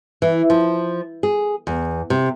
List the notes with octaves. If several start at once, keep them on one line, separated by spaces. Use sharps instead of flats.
E3
F3
G#4
E2
C3